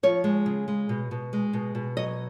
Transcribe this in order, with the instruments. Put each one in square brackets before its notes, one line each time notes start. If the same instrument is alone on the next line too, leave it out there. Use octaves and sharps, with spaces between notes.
[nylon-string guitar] F3 C#5
G#3
C#3
G#3
B2
B2
G#3
B2
B2
F#3 D#5